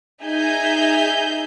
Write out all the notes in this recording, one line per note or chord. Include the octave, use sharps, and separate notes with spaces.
D#4 G#4 E5 G#5 G6